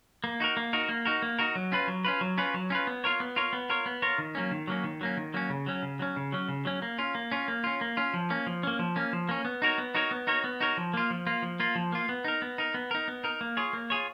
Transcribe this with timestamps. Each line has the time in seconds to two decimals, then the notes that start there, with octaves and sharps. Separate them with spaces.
0.24 A#3
0.40 D#4 F#4 A#4
0.57 A#3
0.73 D#4 F#4 A#4
0.89 A#3
1.05 D#4 F#4 A#4
1.22 A#3
1.39 D#4 F#4 A#4
1.55 F#3
1.72 C#4 F4 B4
1.88 F#3
2.05 C#4 F4 B4
2.21 F#3
2.38 C#4 F4 B4
2.54 F#3
2.70 C#4 F4 B4
2.87 B3
3.04 F4 A#4 C#5
3.20 B3
3.36 F4 A#4 C#5
3.53 B3
3.70 F4 A#4 C#5
3.86 B3
4.02 F4 A#4 C#5
4.18 D#3
4.35 F#3 A#3 C#4
4.51 D#3
4.67 F#3 A#3 C#4
4.84 D#3
5.01 F#3 A#3 C#4
5.17 D#3
5.34 F#3 A#3 C#4
5.50 C#3
5.66 F#3 C#4
5.83 C#3
5.99 F#3 C#4
6.16 C#3
6.32 F#3 C#4
6.49 C#3
6.65 F#3 C#4
6.82 A#3
6.98 C#4 F4
7.15 A#3
7.32 C#4 F4
7.48 A#3
7.64 C#4 F4
7.81 A#3
7.97 C#4 F4
8.14 F3
8.30 A#3 C#4
8.47 F3
8.63 A#3 C#4
8.79 F3
8.96 A#3 C#4
9.13 F3
9.29 A#3 C#4
9.45 B3
9.62 D#4 F#4 A#4 C#5
9.78 B3
9.95 D#4 F#4 A#4 C#5
10.11 B3
10.27 D#4 F#4 A#4 C#5
10.44 B3
10.60 D#4 F#4 A#4 C#5
10.77 F3
10.94 A#3 F4
11.10 F3
11.27 A#3 F4
11.42 F3
11.60 A#3 F4
11.75 F3
11.92 A#3 F4
12.09 B3
12.24 D#4 A#4
12.42 B3
12.58 D#4 A#4
12.74 B3
12.91 D#4 A#4
13.08 B3
13.24 D#4 A#4
13.41 A#3
13.57 F4 G#4 C#5
13.73 A#3
13.90 F4 G#4 C#5